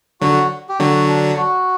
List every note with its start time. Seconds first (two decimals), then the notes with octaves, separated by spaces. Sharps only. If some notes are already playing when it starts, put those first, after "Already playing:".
0.21 D3 F#3 F#4
0.69 G4
0.79 D3 F#3 F#4
1.08 D4
1.37 F#4